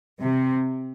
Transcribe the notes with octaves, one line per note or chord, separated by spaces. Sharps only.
C3